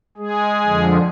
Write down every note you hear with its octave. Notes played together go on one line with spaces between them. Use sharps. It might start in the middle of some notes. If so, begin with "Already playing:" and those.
G#3 G#4
F2 D3 F3